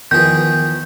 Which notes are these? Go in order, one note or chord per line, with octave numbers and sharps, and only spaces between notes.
E2 D#3 F3 G#4 B4 G6